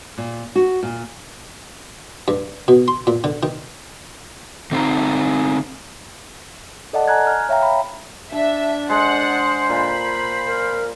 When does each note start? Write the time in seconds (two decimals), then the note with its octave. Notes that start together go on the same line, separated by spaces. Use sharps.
0.18 A#2
0.56 F#4
0.83 A#2
2.28 G2
2.68 B2
2.88 C6
3.07 A#2
3.24 D3
3.43 D#3
4.72 D3 C4 D#4 C5 F5 A#5
6.93 A4 D5 D#5 F#5 A5
7.08 G#5 A#5 F#6 G#6
7.27 F6
7.49 C#5 E5 F5 G5 A#5
7.63 B5
8.32 D4 E5 A5
8.90 G#3 C5 F#5
9.69 A#2 B5
10.46 A#4